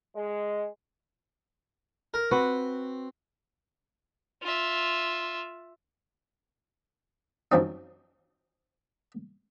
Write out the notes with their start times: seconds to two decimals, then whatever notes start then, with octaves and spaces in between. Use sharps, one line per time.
0.15 G#3
2.14 A#4
2.31 C4 F#4 B4 F#5
4.43 F4 E5
7.52 F#2 F3 C4 D#4